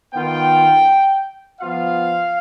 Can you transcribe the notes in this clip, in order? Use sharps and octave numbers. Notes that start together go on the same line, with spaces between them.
D#3 B3 F4 G5
F3 B3 F4 F5